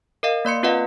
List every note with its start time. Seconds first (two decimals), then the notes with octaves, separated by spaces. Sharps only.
0.23 A#4 D#5 F5
0.45 A#3 D5 C6 C#7
0.63 C4 F4 B4 D#5 F5 F#5